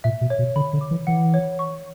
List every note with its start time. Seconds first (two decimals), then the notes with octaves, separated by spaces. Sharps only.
0.04 A#2 E5
0.21 B2
0.30 C#5
0.39 B2
0.56 D3 B5
0.73 D3
0.81 D6
0.91 E3
1.07 E3 F#5
1.34 C#5
1.59 C#6